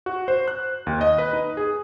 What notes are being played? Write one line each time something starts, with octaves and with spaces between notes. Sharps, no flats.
F#4
C5
F#6
D#2
D#5
B4
D#4
G#4